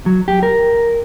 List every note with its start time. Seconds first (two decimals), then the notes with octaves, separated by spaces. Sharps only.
0.06 F#3
0.28 G4
0.43 A#4